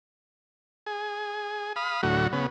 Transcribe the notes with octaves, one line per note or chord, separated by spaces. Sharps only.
G#4
F5 B5 D#6
D2 A2 F#3 F#4
C#3 B3